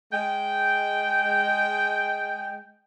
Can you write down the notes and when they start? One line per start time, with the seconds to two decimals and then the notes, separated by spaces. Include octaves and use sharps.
0.13 G#3 G5